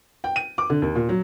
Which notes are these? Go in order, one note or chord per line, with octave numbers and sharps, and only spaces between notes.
G5
D#7
D6
D3
D#2
A#2
F#3